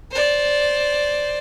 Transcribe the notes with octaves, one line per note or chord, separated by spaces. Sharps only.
C5 D5